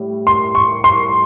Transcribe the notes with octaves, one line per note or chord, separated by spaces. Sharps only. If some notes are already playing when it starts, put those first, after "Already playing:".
Already playing: A2 G3
C6
C#6
C6